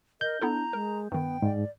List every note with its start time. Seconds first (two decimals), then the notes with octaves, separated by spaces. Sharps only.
0.21 A#4 D#5 G6
0.41 B3 D4 E4 A4 A#5
0.73 G#3 A#4
1.12 G2 D#3 B3 G5
1.42 G#2 D5